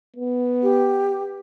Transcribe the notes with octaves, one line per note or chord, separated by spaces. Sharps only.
B3
G4